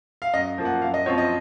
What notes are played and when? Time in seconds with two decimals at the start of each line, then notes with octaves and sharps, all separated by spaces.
0.22 F5
0.33 F#2 D#5
0.58 F3 A#3
0.65 F#5
0.82 F#2 F5
0.94 D#5
1.06 F3 C4 C#5
1.18 D#5